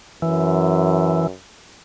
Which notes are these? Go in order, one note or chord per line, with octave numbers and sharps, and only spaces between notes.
F#2 E3